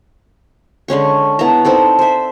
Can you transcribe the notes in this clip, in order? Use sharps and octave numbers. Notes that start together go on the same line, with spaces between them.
D3 G#3 C#4 C#6
B3 E4 A5 A#5
C4 D#4 A4 D5
C5 E5